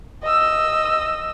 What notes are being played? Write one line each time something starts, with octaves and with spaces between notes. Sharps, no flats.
D#5 E6